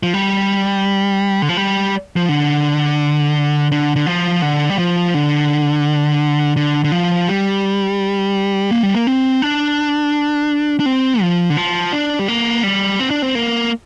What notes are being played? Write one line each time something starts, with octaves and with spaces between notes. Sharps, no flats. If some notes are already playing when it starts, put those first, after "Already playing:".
F3
G3
D3
F3
G3
F3
D3
D3
D3
F3
D3
G3
F3
D3
D3
D3
F3
G3
A#3
G3
A#3
C4
D4
D4
C4
F3
D3
F3
D4
G3
A#3
G3
C4
D4
C4
A#3